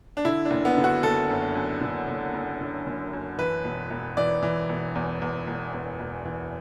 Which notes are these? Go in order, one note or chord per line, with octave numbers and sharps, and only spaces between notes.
D4
D3 E4
D4
F#1
B3
D3
F#4
F#1 A4
F#2
F#2
D3
F#1
F#1
D3
F#1
F#2
E3 B4
E1
E1
E3 D5
E3
E1
E2
E2
E1
E2
E1
E3